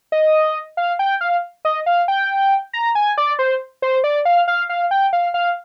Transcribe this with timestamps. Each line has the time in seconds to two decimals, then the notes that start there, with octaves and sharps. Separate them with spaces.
0.12 D#5
0.77 F5
0.99 G5
1.21 F5
1.65 D#5
1.86 F5
2.08 G5
2.73 A#5
2.95 G#5
3.18 D5
3.39 C5
3.82 C5
4.04 D5
4.25 F5
4.48 F5
4.69 F5
4.91 G5
5.13 F5
5.34 F5